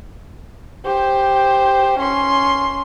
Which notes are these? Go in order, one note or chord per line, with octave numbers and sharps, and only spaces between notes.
G4 C5
C#4 C6